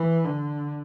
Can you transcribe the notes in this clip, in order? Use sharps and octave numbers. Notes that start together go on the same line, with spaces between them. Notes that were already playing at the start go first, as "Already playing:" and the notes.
Already playing: E3
D3